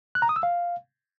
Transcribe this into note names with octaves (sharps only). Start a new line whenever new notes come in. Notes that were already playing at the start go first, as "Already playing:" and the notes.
F#6
A#5
D#6
E6
F5